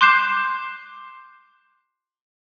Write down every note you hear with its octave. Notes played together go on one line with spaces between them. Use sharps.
C6 D6 F#6 G6 C7 E7